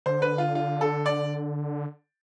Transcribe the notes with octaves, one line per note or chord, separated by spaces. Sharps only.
D3 C5
B4
F4
F4
A4
D5